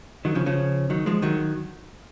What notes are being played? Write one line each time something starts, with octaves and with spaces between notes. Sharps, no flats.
D#3 F#3
C#3 F3
C#3 F3
D#3 F#3
F3 G#3
D#3 F#3